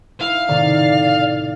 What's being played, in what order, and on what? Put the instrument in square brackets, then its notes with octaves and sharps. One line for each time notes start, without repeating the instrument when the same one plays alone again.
[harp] E4 [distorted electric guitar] F5
[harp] A2 C3 D#3 [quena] D5